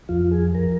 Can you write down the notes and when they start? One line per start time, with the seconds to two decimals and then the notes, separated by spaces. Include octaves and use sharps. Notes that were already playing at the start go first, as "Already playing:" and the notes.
0.09 F2 F3 F4
0.31 G#4
0.55 F3 A#4